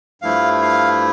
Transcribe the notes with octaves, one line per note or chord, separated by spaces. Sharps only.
G2 F3 A3 E4 F5
F5